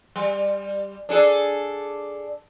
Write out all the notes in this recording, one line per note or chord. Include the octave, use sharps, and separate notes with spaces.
G3
D4 G#4 A4